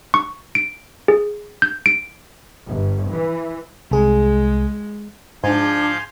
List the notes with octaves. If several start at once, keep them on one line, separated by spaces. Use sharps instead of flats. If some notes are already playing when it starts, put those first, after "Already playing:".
C#6
D7
G#4
G6
D7
G1
E3
C2 G#3 G#4
G#2 F3 D4 F4 G#5 C6 G6